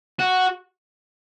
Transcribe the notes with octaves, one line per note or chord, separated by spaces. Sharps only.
F#4